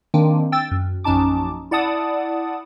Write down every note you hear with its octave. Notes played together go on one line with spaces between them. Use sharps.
D#3 A#3 C4 D4
G5 E6 A6
F#2
A#1 F#2 C#4 D#4 A5 D6
E4 D5 F#5 A5 D#6